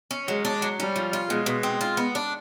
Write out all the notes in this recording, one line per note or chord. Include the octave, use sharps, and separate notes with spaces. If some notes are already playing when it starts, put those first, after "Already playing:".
C#4
F#3 G#3
D4
F#3
G3 C#4
F3
F4
B2 G#3
B2
C4
F4
B3
D4